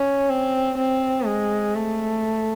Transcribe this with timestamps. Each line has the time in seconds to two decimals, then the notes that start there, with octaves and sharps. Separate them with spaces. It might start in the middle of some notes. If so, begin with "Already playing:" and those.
Already playing: C#4
0.30 C4
0.78 C4
1.26 G#3
1.75 A3